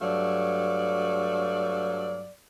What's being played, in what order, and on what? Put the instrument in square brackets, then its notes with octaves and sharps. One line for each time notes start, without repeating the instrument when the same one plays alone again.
[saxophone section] G2 F#3 A3 D5 F5